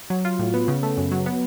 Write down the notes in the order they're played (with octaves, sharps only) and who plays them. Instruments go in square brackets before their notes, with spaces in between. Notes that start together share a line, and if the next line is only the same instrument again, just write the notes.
[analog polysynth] F#3
F4
A2
B3
C#3
A3
F#2
F#3
B3